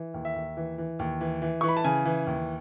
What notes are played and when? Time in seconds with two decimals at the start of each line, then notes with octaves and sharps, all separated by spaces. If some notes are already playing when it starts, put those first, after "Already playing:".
Already playing: E3
0.14 D#2
0.25 E5
0.36 D#2
0.57 E3
0.78 E3
0.99 D#2
1.21 E3
1.42 E3
1.61 E3 C#6
1.69 B5
1.77 A5
1.84 C#3 G#5
2.05 E3
2.27 D#2